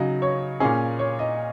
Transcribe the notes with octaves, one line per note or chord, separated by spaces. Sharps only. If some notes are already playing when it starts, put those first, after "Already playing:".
Already playing: C#3 F#3 D#4 D#5
C#5
A#2 A#3 C#4 G#4
C#5
D#5